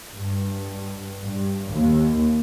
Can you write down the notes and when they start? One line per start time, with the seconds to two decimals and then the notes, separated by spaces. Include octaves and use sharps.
0.14 G2
1.24 G2
1.72 D#2